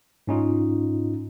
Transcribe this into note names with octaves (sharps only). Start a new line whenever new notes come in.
G#2 C#4 D#4 F4